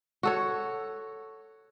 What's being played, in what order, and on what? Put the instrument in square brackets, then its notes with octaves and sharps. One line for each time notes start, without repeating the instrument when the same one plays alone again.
[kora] F#4 A4 C#5